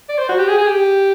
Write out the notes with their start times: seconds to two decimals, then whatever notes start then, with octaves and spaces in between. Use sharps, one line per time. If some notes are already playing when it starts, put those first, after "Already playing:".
0.09 D5
0.18 C5
0.29 F#4
0.38 G4
0.48 G#4
0.58 G#4
0.67 G4